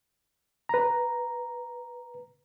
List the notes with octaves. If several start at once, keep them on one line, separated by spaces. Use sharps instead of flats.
B4 A#5